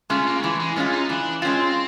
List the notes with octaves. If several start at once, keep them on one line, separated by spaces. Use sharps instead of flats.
G#3 A3 C#4 F4
A#3
E3 A3
G#3
G#3 A3 C#4 F4
D#4
E3 D4
G#3 C4 C#4 F4